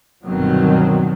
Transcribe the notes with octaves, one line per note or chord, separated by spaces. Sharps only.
G1 G2 B2 D#3 F#3 C4